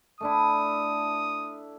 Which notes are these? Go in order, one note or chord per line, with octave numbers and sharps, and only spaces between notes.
A3 D4 E4 D#6